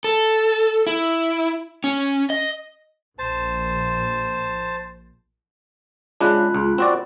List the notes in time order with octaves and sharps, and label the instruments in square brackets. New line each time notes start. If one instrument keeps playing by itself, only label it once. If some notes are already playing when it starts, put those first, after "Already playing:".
[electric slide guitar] A4
E4
C#4
D#5
[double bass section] A#1 [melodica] C5 A5
[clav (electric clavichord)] C#3 G#3 D4 [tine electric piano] F4 B5 F#6
[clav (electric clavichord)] C#2
C4 F#4 D5